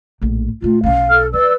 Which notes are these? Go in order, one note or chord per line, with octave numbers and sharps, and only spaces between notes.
A#1 A2
A#2 A3 F4
B1 C#4 F5
A4 F6
F#3 B4 D5 E6